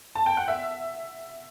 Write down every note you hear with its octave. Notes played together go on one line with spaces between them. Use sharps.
A5
G5
F#5
E5